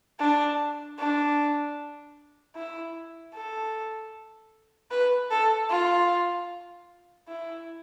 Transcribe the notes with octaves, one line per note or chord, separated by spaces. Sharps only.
D4
D4
E4
A4
B4
A4
F4
E4